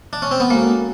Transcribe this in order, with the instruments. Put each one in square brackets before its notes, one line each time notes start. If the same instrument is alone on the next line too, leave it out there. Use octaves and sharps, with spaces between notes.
[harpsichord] D4
C#4
C4
B3
[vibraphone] G#3 C#4 F#4 A4 C#5 [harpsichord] A#3